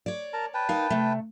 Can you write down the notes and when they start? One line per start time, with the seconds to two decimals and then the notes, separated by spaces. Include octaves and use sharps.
0.06 C#5 D5
0.33 A#4 A5 A#5
0.54 B4 G5 A5
0.69 D#4 A#4 F5
0.90 C3 A3